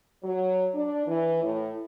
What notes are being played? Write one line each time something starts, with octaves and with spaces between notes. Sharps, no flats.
F#3
D4
E3
A2